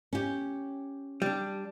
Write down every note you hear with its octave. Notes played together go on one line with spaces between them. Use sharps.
C#4 G4
G3 D4